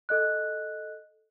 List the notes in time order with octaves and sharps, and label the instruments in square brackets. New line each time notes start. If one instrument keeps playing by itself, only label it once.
[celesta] A4 D#5 F#6